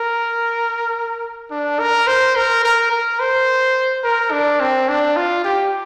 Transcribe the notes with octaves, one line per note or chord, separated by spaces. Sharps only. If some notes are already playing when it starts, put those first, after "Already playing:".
Already playing: A#4
D4
A#4
C5
A#4
A#4
A#4
C5
A#4
D4
C4
D4
F4
G4